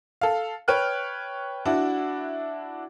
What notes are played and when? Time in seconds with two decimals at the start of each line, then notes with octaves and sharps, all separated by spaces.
0.21 A4 F5
0.68 B4 C#5 G5 F6 F#6
1.65 D4 E4 F#4